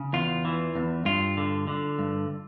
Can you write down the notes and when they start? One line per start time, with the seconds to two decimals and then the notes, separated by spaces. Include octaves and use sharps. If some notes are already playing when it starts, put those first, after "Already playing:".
Already playing: C#3
0.13 E2 F4
0.45 E3
0.75 E2
1.05 G2 F4
1.37 D3
1.67 D3
1.99 G2